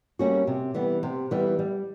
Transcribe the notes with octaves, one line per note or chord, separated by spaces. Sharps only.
G3 A#3 C#4 F#4
C3
E3 G3 B3
C3
E3 G3 B3
G3